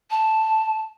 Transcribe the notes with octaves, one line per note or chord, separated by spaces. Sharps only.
A5